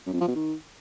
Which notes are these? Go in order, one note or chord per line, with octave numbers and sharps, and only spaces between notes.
F#2
F2
F3
B2
D#3